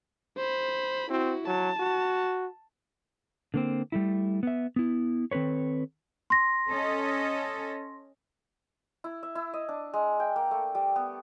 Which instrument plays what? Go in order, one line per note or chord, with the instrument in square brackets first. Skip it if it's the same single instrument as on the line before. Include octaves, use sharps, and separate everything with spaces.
[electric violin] C5 B5
[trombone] C4 [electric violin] E4 F#4
[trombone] F#3 [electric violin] A5
[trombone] F#4
[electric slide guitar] D3 A#3 C4
G3 A3 E4
B3 E5
B3 E4
D#3 C4 A4 B4 C#5
[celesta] C6 A#6
[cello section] C#4 A4 D#5
[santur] E4
E5
E4
D#5
D4
G#3
G5
A#3
A3
G3
B3